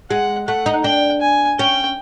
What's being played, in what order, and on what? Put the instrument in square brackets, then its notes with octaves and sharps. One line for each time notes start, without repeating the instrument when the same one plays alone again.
[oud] G#3 [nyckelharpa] F#5
[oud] A3 [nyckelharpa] F#5
[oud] D#4
[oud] D4 [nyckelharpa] G5
[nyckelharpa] G#5
[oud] C#4 [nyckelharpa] G5